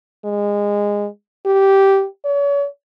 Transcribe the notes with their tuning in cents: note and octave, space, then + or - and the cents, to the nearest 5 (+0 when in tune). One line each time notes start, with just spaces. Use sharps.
G#3 -20
G4 -10
C#5 +40